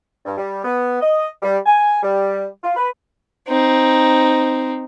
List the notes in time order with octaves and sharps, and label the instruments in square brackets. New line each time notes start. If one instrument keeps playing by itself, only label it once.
[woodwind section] G2
G3
B3
D#5
G3
G#5
G3
F4
B4
[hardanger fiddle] C4 D#4